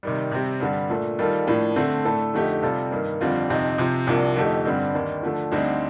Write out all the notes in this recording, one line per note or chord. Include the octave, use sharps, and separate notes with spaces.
C3 D#3 G3
C3 G3 C4 G4
G2 D3 G3
A#2 A3 D4
D#3 G3 A#3 F4 A4
A2 F3 A#3 D4
D3 A3 C4
A2 A3 D4 A4
F2 D3 A3 D#4 G4
C3 G3 C4 F4 A4
G2 D#3 A#3
F2 D3 G3 C4 F4
F2 C3 F3 C4 D#4
C3 F3 C4
C2 C3 F3 A#3 D4
F2 D3 A3 D#4 G4
G2 D3 G3 C4
D#2 D#3 G3 D4
D3 F3 A3 D4
D2 D3 G3 C4 D#4